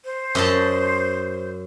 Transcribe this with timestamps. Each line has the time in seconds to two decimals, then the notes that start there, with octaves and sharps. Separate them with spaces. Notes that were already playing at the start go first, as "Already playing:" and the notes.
0.05 C5
0.35 F#2 D#5 A5